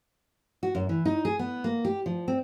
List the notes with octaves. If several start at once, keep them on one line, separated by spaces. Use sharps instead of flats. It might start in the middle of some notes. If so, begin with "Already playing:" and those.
F#4
F#2
E3
D#4
G#4
B3
A#3
G4
F3
C4